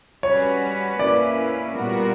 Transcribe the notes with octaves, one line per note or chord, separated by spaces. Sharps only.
G3 C#4 F#4 B4 C#5
A#3 C#4 E4 B4 D5
A#2 G3 B3 F#4 A#4